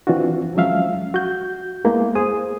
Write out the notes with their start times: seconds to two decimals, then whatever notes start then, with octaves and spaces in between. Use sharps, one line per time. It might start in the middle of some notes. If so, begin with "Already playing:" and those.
0.07 E3 C4 D4 F4 F#4
0.55 F3 F#3 G#3 C#4 E5 F5
1.14 F#4 G6
1.85 G#3 A#3 B3 E4
2.15 G#4 C5 D#6